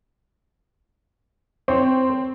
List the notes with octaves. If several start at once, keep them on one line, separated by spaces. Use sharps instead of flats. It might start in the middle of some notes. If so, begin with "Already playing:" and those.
C4 C5 C#5